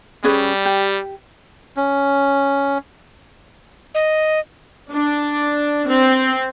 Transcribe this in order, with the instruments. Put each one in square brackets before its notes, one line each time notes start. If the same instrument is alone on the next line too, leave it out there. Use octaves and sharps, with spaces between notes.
[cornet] G3 [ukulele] C#4 G#4 B4
[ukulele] G4
[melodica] C#4
[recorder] D#5
[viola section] D4
C4